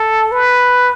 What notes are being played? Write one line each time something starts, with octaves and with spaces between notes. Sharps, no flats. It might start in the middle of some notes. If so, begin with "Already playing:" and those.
Already playing: A4
B4